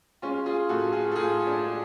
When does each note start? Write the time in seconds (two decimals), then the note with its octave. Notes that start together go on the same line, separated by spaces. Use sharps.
0.22 G#3 C#4 F4
0.46 F4 G#4
0.69 A2 F#4 A4
0.92 F4 G#4
1.12 A4
1.16 A2 F4 G#4
1.47 D4
1.63 G#3